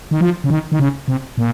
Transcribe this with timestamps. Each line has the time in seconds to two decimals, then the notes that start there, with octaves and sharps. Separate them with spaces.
0.11 D#3
0.21 F3
0.44 C#3
0.50 D#3
0.72 D#3
0.80 C#3
1.08 C3
1.38 A#2